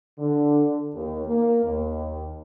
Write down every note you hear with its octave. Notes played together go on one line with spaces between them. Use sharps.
D3
D#2
A#3
D#2